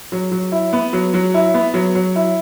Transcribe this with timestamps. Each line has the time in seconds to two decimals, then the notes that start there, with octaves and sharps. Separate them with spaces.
0.12 F#3
0.32 F#3
0.52 E4
0.73 B3
0.93 F#3
1.14 F#3
1.34 E4
1.54 B3
1.74 F#3
1.95 F#3
2.16 E4